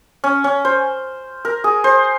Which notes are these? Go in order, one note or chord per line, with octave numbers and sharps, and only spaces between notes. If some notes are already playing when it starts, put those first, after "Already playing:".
C#4
C#4
C5
A#4
G#4
C5